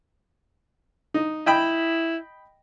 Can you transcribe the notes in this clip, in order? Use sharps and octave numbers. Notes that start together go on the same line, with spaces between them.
D#4
E4 D#5 G5 B5